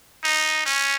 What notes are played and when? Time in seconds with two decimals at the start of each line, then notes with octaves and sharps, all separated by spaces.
0.24 D#4
0.66 C#4